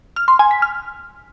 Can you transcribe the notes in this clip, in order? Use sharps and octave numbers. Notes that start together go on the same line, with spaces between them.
F6
C6
G#5
B6
F6